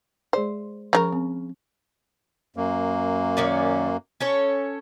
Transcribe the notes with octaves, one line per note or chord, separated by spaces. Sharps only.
G#3 G#4 C5 D5
C#3 F3 D4 A#4 C#6
C4
F#2 A#3
D#3 C#4 D5
C#4 A4 C#5